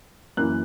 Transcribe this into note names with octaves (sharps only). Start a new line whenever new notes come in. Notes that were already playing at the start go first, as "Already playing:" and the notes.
F#2 E3 A#3 F#6